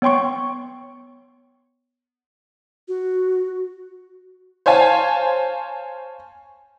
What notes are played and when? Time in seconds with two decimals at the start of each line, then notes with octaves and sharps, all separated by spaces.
0.02 B3 C#5 G5 C6 C#6
2.88 F#4
4.66 C5 C#5 F5 G#5 A5